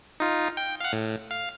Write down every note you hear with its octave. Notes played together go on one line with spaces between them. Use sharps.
D#4 F4
G5
F5 F#5
A2
F5